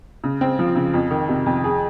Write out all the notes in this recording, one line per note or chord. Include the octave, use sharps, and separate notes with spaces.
C#3
C4
F3
C#3
F2
D#3
C3
F2
G#4